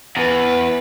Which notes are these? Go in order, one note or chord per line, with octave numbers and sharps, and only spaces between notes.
E2 B4